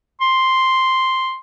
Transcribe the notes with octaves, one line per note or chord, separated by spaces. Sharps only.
C6